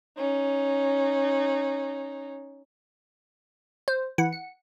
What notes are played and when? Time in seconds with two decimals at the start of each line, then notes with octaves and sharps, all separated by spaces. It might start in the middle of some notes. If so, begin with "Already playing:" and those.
0.17 C#4 D#4
3.88 C5
4.18 E3 F#5
4.33 C#7